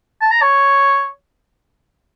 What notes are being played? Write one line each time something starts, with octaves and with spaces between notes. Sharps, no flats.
A5
A#5
C#5